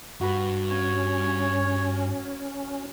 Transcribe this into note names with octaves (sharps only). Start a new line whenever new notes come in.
G2 F#4 B4
C#4 C#5